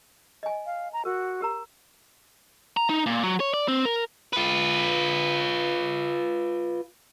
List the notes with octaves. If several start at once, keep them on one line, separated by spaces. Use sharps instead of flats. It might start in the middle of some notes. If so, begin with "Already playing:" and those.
D#5 G#5
F5
A#5
F#4 A#4
G4 A#4 A#5
A#5
D#4
A#2
F#3
C#5
D5
C4
A#4
F4 B4